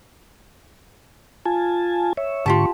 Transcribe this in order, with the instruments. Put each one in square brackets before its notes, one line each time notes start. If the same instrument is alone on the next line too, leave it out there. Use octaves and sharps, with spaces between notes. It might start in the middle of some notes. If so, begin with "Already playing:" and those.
[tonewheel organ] F4 G#5 A5
C#5 E5
[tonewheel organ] G#2 D3 C#6 [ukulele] F4 G4 A5